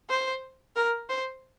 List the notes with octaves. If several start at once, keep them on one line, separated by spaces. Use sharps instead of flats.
C5
A#4
C5